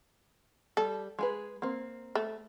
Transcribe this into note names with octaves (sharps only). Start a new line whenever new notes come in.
G3 A4
G#3 G#4 B4
A#3 C4
A3